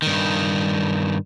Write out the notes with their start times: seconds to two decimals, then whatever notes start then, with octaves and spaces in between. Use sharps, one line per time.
0.02 G2 D#3